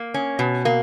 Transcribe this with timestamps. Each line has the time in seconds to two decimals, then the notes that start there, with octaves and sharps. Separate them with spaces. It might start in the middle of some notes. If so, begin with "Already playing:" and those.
Already playing: A#3
0.14 C#4
0.39 B2
0.65 A#3